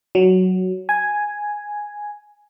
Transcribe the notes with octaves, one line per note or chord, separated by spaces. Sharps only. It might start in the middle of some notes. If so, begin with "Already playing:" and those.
F#3
G#5